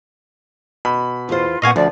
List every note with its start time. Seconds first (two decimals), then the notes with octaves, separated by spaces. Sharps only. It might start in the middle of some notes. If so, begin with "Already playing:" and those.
0.85 B2 B5
1.29 E2 F4 C5
1.62 A#2 B3 D#5 F5 F#5 G#5 C#6
1.76 D2 F3 D5